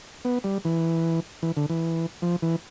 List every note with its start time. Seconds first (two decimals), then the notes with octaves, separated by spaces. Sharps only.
0.25 B3
0.44 G3
0.65 E3
1.43 E3
1.57 D3
1.70 E3
2.22 F3
2.42 E3